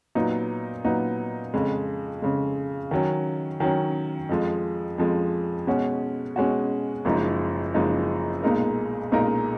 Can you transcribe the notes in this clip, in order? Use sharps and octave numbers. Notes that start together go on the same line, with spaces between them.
A#2 F#3 B3 D#4
A#2 F#3 B3 D#4
F2 C#3 G#3
F2 C#3 G#3
D#3 F#3 C#4
D#3 F#3 C#4
F2 F3 G#3
F2 F3 G#3
B2 G#3 C#4 F#4
B2 G#3 C#4 F#4
F#1 F#2 F3 G#3 D#4
F#1 F#2 F3 G#3 D#4
B1 A#2 G#3 D#4 A#4
B1 A#2 G#3 D#4 A#4